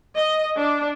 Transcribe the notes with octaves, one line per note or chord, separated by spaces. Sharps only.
D#5
D4